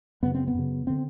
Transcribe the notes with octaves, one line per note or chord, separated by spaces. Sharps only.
F#2 C#3 B3
C4
B3
F#2 C#3
D3 C4